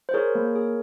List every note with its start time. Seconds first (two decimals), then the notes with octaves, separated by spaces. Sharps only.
0.09 C5
0.14 G#4 A#4 C#5
0.35 A#3
0.56 G#4